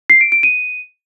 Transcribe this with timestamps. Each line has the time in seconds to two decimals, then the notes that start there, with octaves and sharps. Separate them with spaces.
0.10 C7
0.21 D7
0.32 D7
0.43 D#7